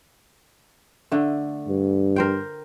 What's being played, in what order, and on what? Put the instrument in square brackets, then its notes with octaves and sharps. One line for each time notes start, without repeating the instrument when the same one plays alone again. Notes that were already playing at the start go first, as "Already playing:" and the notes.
[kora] D3 A3
[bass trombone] G2
[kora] A#4 C5 G5